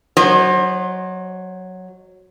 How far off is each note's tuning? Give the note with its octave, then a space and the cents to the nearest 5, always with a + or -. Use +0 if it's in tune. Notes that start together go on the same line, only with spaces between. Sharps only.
F#3 +0 C5 +30 D#5 -15